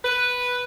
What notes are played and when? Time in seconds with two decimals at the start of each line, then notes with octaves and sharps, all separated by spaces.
0.04 B4